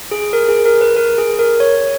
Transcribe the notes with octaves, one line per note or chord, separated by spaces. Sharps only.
G#4
A#4
G#4
A#4
B4
A#4
G#4
A#4
C#5